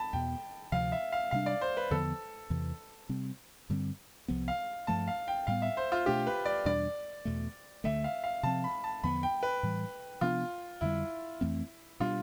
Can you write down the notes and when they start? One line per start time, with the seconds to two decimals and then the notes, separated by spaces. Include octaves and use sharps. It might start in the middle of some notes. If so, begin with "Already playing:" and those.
Already playing: A5 B5
0.13 E2 B2 B3 G5
0.72 D2 C3 F3 F5
0.92 E5
1.12 F5
1.31 C3 G3 D4 F5
1.46 D5
1.61 C5
1.77 B4
1.91 E2 D3 F3 B3 A4
2.50 E2 C3 E3
3.09 C3 G3 C4
3.70 G2 D3 G3 C4
4.28 C2 C3 F3 B3
4.48 F5
4.87 G2 F3 A3 A5
5.08 F5
5.28 G5
5.47 A2 G3 B3 F5
5.62 E5
5.77 C5
5.92 F4
6.06 B2 A3 D4 G4
6.27 B4
6.45 D5
6.65 E2 B2 G3 D4 D5
7.25 E2 B2 A3
7.84 D2 D3 A3 E5
8.04 F5
8.24 F5
8.43 C3 F3 C4 A5
8.64 B5
8.84 A5
9.03 E2 D3 F3 B3 B5
9.23 G5
9.43 B4
9.63 A2 E3 G3
10.21 C3 F3 B3 D4 F4
10.81 F2 D3 G3 E4
11.41 F2 E3 A3 C4
12.00 B2 G3 D4 F4